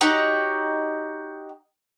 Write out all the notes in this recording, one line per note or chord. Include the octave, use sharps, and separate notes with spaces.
D#4 F#4 G4 C#5